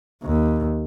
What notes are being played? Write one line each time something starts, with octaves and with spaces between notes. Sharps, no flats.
D#2